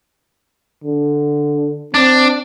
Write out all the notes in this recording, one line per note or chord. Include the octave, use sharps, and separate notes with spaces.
D3
C4 D4